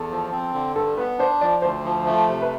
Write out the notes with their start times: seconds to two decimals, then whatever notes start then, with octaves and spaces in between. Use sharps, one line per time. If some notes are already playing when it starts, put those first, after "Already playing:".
Already playing: E2 A4
0.11 F3
0.32 C4
0.54 D3
0.75 G2 A4
0.98 B3 B4
1.19 D4 C5
1.41 F3 D5
1.62 D2 C5
1.84 F3
2.06 A3
2.28 C3
2.42 B4